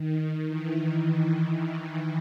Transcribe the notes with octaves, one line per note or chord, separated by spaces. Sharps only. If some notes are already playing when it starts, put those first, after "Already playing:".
Already playing: D#3
E3